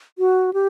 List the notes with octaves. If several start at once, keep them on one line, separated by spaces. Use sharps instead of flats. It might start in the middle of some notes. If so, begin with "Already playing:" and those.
F#4
G4